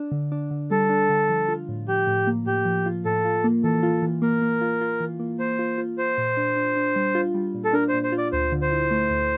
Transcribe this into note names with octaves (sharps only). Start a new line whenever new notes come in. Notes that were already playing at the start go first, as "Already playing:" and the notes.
Already playing: D4
D3
D4
D3
G3 A4
D4
D3
F3
F4
A2
F3 G4
A2
A#3
A2 G4
F3
F4
A2 A4
F4
A#3
E3 A4
F4
E3
A#3 A#4
A#3
F4
F4
E3
A#3
A#3 C5
F4
F4
F4 C5
A#2
D4
D4
D4
G3
F4
G3
A#2
A4
D4 A#4
A#2 C5
C5
F4
D5
D2 C5
D3
C5
E4
A3
D2